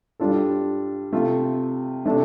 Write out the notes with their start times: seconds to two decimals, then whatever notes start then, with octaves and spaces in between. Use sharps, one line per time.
0.20 G2 G3 D4 F4 A4
1.13 C3 A3 F4
2.05 C3 A3 D4 A4